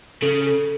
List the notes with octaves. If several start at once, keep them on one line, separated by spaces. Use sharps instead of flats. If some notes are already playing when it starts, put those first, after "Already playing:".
C#3 A4
A4